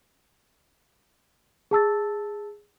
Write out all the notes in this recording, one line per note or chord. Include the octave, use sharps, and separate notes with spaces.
G#4 A5 E6 A6